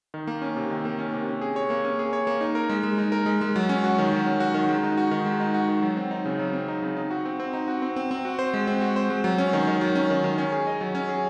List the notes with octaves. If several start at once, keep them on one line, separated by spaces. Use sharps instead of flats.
D#3
A#3
C#4
C3
D#3
A#3
C#4
C3
C#4
G#4
C#5
A#3
C#4
G#4
C#5
A#3
D#4
A#4
G#3
G#3
D#4
A#4
G#3
G#3
F#3
C#4
F#4
D#3
F#3
C#4
F#4
D#3
G#3
D#4
F#4
D#3
G#3
D#4
F#4
D#3
F#3
C4
D#4
C#3
F#3
C4
D#4
C#3
D#4
F#4
C4
C4
D#4
F#4
C4
C4
C4
F#4
C5
G#3
C4
F#4
C5
G#3
F#3
C#4
D#3
D#3
F#3
C#4
D#3
D#3
C#4
G#4
D#5
F#3
C#4
G#4